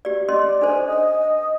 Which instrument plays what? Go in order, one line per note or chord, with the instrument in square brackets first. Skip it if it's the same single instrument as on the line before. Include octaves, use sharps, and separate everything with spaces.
[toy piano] G4 D5
[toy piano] C#4 D#5 C6 [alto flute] D5
[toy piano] D4 A4 C5 [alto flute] G#5
[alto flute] D#5